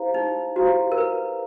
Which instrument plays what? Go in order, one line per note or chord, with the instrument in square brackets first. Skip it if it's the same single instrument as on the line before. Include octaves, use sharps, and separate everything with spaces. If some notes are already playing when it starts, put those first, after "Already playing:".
Already playing: [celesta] E4 G4 C5 F5 A#5
[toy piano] D#4
[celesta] E4 G4 C5 F5 A#5 [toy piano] F#4
[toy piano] A#4
B4